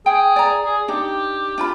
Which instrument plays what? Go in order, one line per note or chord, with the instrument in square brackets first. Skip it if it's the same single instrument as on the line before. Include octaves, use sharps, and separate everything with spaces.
[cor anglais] G#4 [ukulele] G5
[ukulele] D5 A#5
[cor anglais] G#4
[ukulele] D4 D#4 [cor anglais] G4
[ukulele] D4 F4 B5